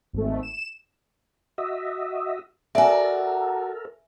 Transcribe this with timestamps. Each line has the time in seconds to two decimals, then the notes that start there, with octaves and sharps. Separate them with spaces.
0.13 G#1 A3
0.43 E7
1.58 F#4 D#5 E5
2.75 F#4 A4 A#4 D5 E5 G#5